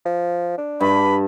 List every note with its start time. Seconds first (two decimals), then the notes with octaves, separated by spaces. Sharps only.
0.05 F3
0.58 D4
0.80 G2 B5